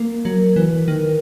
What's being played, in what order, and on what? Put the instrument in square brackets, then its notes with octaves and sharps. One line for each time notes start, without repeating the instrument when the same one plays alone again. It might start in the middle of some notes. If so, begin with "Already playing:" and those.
Already playing: [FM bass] A#3
[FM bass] F#3 [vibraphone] A#4
[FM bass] E3 [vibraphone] B4
[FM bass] D#3 [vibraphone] A#4